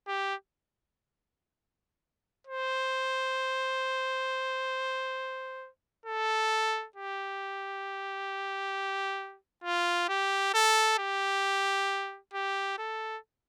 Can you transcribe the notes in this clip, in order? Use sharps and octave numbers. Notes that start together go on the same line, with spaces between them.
G4
C5
A4
G4
F4
G4
A4
G4
G4
A4